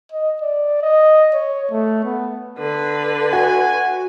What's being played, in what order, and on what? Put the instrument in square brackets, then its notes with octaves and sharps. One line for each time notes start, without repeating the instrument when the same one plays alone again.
[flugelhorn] D#5
D5
D#5
C#5
A3
B3
[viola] D3 B4
[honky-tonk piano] F#4 [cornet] G#5